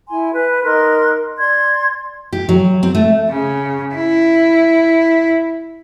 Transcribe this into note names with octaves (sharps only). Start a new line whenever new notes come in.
E4 G#5 C6
B4 F#6
D#4 A#4 C6 F#6
D5 C6 G#6
G4
F#3
C4
A3
C#3
E4